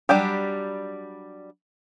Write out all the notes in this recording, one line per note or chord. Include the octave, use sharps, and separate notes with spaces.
F#3 G3 D4 G4